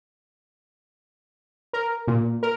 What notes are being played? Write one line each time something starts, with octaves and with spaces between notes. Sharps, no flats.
A#4
A#2
A#4